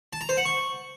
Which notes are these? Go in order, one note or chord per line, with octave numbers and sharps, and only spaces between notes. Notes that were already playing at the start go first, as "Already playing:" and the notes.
A5
A#5
C5
F#5
C#6